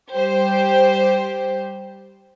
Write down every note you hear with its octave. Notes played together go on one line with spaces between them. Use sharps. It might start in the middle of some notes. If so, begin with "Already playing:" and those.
G3 G4 C5